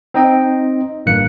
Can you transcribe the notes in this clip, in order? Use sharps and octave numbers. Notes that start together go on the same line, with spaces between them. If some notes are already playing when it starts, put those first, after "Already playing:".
C4 D#4 D#5 G5
A1 G2 A#3 F#6 C#7